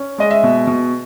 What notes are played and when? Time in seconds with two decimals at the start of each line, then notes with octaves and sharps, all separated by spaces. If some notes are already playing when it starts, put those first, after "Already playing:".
Already playing: C#4
0.18 G#3 D#5
0.30 E5
0.43 B2
0.67 B2